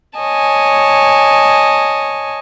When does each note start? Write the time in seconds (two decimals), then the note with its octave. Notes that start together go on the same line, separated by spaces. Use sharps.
0.20 C#5 D#5 G#5 A5